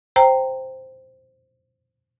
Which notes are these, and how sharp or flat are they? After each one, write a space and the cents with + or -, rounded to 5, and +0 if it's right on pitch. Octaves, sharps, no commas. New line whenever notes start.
C5 +0 G5 +0 A#5 -15